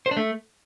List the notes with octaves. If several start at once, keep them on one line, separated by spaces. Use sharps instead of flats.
C5
D4
A3